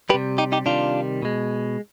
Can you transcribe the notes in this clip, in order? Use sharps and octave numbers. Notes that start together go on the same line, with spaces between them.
C3 G3 G4 B4
D#4 G4
D#4 G4
C3 D#3 G3 D4 F4
B2 G#3